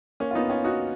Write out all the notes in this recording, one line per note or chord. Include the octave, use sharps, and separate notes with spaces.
A#3 C#4
F4
B3 D#4
C#4 F4
D#4 F#4